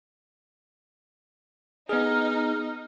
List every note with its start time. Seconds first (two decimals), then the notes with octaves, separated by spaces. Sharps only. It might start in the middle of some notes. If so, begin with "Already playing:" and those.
1.89 B3 D#4 G#4 F6